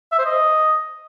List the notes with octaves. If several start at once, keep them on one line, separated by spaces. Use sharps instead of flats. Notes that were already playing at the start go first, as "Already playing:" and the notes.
E5
C5
D#5